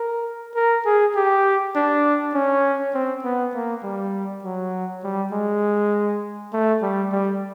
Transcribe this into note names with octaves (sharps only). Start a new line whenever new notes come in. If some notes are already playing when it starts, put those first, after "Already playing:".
Already playing: A#4
A#4
G#4
G4
D4
C#4
C4
B3
A#3
G3
F#3
G3
G#3
A3
G3
G3